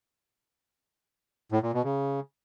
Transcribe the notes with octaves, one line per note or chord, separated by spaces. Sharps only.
A2
A#2
B2
C#3